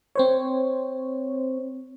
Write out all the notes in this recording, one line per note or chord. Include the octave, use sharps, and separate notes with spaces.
C4 C5 C#5